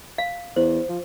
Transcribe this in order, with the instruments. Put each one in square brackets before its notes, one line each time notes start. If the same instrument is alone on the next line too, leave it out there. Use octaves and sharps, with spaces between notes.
[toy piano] F5
[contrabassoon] E2 [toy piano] C5
[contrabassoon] F3